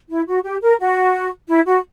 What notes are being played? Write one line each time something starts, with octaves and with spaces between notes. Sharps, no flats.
E4
F#4
G4
A#4
F#4
E4
F#4